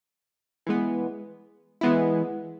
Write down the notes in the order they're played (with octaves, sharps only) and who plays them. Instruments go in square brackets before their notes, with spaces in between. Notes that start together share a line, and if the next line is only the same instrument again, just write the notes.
[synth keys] E3 G#3 B3
E3 G#3 B3 E4